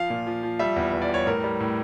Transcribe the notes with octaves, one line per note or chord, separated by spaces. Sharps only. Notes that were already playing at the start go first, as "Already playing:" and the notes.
Already playing: F3 F5
A#2
F3
F3
G3 E5
E2
E2
D5
G3 C#5
A2 A#4
G3
A2